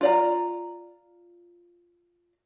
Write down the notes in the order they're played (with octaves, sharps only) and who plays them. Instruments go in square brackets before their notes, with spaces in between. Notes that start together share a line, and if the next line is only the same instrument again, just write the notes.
[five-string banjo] F4 D5 A#5